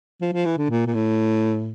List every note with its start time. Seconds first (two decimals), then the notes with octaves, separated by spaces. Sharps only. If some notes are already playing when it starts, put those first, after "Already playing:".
0.21 F3
0.33 F3
0.45 E3
0.58 D3
0.70 A#2
0.87 A#2
0.94 A2